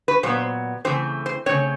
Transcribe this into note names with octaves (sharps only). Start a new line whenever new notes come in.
B4
A#2 F#3 B3 C5
C#3 E3 A3 C4 C5
C5
C#3 E3 A3 C4 C#5